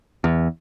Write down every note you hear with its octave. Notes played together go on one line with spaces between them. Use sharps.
E2